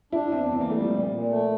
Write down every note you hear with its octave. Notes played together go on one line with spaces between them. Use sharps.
D4 E4
E2 C4
E3 C4
A#3
G3 A3
F3
A#2
A#2
A3